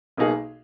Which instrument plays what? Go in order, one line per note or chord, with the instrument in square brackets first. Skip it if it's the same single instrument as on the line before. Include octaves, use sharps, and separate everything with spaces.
[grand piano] B1 B2 A#3 D#4 G#4